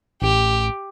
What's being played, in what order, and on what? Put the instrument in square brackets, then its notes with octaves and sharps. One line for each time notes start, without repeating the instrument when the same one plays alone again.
[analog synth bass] A1 [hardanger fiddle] G4